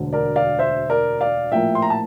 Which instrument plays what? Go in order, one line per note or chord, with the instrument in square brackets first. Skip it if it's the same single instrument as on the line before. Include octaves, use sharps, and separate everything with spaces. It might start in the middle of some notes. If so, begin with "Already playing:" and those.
Already playing: [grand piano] E1 D2 D3
A#4 D5
D5 F5
C5 E5
A#4 D5
D5 F5
A#1 A2 F3 A#3 E5 G5
C6
A#5
A5